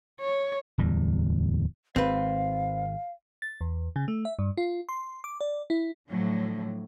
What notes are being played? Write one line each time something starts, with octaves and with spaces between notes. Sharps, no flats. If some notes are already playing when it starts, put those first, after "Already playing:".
C#5
D1 E2 G3
G#1 C4 B4 F5
A6
E2
C#3
A3
E5
G2
F4
C6
D6
D5
E4
A2 D3 F3 F#3